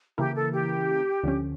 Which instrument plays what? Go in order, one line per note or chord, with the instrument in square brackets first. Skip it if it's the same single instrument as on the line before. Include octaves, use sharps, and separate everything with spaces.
[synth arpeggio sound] C#3 E3 A#3 E4 A#4 [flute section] G4
[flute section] A4
G4
[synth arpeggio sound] D2 D3 F3 C#4